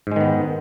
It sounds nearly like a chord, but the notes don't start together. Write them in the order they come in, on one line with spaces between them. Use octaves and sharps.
G#2 G#3 D#3 B3